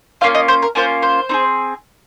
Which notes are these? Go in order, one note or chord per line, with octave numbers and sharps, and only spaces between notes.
A#3 C#4 F4 F5
D#5
C5
A#4
A#3 C#4 F4 C5
C5
C4 D#4 G#4